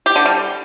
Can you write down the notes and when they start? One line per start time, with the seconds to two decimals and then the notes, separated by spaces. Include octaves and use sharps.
0.06 G4
0.16 D3
0.25 G3